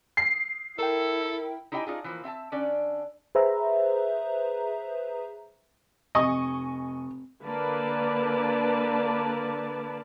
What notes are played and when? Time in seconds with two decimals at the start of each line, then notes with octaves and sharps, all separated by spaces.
0.17 C7
0.79 E4 A4 A#4 G5
1.72 D#4 E4 G4 D#5 G5 G#5
1.87 D4 D#4 F4 G#4
2.04 E3 F3 A#3
2.24 C4 E5 G#5 A5
2.52 D3 C#4 D4 D5
3.35 G#4 B4 C5 E5 A#5
6.15 F1 D#5 G#5 C#6
7.42 D3 A#3 B4 D5 A5